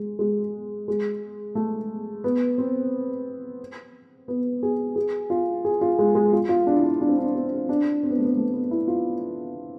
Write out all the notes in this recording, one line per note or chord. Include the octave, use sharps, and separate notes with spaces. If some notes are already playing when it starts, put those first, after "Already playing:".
Already playing: G#3
G#3
G#3
A3
B3
C4
B3
G#4
G#4
F4
G#4
F4
G#3
G#3
F4
F4
D4
E4
D4
D4
C4
D4
C4
D4
C4
B3
A3
B3
A3
B3
E4
F4